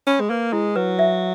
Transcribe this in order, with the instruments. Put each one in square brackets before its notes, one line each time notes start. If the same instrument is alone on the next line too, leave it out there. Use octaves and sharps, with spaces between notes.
[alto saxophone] C#4 [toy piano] B5
[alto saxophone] G#3
[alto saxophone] A#3 [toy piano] B4
[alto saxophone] G#3 [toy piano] E4
[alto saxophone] F#3 [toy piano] B4
[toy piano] E5